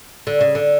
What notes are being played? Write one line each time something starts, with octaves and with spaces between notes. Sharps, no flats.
D3
C#3
D3